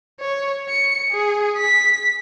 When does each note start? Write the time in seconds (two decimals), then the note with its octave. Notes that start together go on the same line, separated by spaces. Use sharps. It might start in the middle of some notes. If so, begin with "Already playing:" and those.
0.20 C#5
0.70 C#7
1.11 G#4
1.58 B6